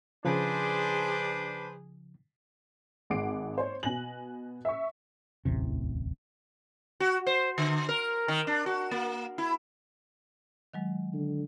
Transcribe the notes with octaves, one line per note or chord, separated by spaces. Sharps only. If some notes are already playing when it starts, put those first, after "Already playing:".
C#3 F3 D4 G#4 B4 C5
G#1 G#3 F#5 D6 C7 D7
C5 C#5
B2 G#5 F#6 A#6 F#7
E5 C#6
D1 A1 E2 C3
F#4
C5
D3
A#4
D#3
D4
F#4
A#3
E4
D#3 F#3 G#3
D3